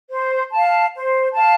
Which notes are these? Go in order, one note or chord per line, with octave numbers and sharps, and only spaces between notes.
C5
F5 A5
C5
F5 A5